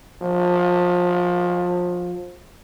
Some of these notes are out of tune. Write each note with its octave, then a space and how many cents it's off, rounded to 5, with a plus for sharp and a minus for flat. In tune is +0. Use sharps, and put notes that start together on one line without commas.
F3 +25